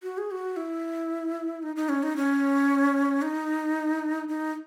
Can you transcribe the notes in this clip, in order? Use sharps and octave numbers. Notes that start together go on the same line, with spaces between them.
F#4
G#4
F#4
E4
D#4
D#4
C#4
D#4
C#4
D#4
D#4